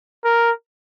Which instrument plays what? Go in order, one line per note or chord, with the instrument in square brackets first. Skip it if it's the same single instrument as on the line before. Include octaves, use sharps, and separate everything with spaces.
[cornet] A#4